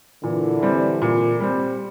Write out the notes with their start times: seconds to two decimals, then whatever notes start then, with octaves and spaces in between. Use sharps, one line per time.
0.23 A#2 D3 E3
0.63 G3 C4
1.02 A#2
1.40 G3 C4